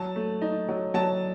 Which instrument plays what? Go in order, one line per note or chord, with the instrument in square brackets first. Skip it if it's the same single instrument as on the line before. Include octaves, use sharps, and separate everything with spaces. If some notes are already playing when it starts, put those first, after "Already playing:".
Already playing: [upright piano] F#3 A5
A3
D#4
F#3
F#3 A5